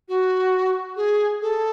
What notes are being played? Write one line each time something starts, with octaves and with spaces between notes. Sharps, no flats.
F#4
G#4
A4